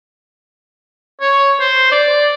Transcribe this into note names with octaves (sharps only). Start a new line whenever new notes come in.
C#5
C5
D5